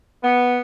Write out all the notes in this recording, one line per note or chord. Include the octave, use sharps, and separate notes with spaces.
B3